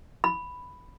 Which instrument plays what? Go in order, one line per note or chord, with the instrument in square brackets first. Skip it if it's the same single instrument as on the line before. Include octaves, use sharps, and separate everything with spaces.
[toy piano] B5